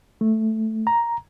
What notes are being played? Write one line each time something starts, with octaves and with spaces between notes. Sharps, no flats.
A3
A#5